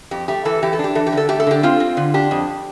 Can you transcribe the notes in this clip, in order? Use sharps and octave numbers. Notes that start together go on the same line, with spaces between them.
F2 G4
A3 G4
E3 A4
E3 G4
A4
D4
G4
E3 A4
G4
D3
A4
A3 G4
A4
D3 G4
C4 F4
C4
D3
D4 G4
F2